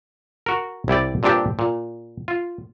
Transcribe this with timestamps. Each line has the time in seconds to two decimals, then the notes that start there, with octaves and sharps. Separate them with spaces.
0.46 F#4 A#4
0.88 C2 E4 G4 D5
1.23 G2 A#2 C4 D4 G4
1.59 A#2
2.28 F4